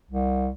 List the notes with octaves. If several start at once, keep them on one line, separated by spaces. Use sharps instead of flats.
C2